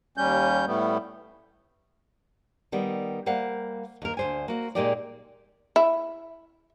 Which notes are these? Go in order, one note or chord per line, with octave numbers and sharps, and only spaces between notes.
D#2 G3 C#4 G6
A2 G3 A3 B3
D#3 G3 B3
G3 A#3 C5 F5 F#5
D#2 A#4
D2 C5 G#5
A#3 F#4
A#2 G#3 A#3 D#4 G4 D5
E4